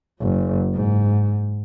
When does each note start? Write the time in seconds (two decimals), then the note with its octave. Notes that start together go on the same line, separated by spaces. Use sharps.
0.21 F#1
0.74 G#2